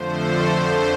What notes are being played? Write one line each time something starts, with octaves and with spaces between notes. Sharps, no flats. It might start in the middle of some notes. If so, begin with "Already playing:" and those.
Already playing: F2 D3 F3 A3 C5
A4
F2 D3 A3 C5